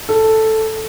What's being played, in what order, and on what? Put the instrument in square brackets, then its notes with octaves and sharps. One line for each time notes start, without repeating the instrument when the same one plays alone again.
[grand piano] A4